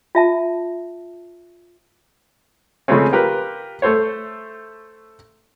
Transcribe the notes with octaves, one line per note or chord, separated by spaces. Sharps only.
F4 E5 A5
C#3 F3 G#3 A3 C4 C#4
F4 G4 A#4 B4
A3 A4 C5 C#5